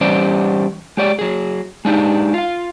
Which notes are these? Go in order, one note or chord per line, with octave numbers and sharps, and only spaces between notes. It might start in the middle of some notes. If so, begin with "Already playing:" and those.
E3 G3 C#4 G4 C5 D5
G#3 G4 C#5 D5
F#3 G#4
G#3 D4 D#4 G4
F4 F5